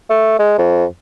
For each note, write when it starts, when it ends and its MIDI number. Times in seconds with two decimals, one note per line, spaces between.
0.10 0.38 57
0.39 0.54 56
0.58 0.85 41